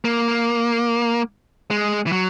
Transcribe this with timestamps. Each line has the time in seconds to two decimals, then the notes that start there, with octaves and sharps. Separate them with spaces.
0.05 A#3
1.71 G#3
2.06 E3
2.12 F#3